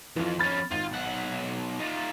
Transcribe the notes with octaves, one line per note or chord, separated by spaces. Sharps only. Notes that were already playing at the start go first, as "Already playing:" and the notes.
F2 E3 F4
F2 C#4 B5 F6 A6
G#1 F4
B1 F#5
D#4 F4